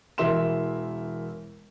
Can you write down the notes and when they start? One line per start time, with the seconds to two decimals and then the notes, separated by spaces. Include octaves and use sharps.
0.18 E1 E3 A#4 E5 C6 E7